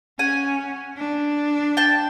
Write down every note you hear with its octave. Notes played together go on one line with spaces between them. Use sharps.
C#4 F#5 G#5
D4
G5 A5